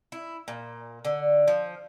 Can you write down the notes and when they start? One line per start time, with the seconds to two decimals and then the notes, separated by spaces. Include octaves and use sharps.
0.12 E4
0.48 A#2
1.05 D3
1.48 F3